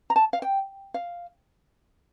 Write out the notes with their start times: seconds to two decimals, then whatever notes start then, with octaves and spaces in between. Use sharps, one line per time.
0.10 A#5
0.16 A5
0.33 F5
0.42 G5
0.94 F5